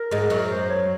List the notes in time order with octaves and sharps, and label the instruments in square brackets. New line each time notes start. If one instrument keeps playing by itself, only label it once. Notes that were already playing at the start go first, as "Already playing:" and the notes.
Already playing: [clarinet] A#4
[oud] G#2 G#3
F#2 F#3
[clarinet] C5
C#5